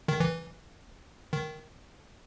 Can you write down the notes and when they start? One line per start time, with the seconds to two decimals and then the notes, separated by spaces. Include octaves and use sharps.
0.08 D#3
0.20 E3
1.33 D#3